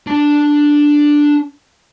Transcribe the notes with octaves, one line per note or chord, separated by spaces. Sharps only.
D4 A5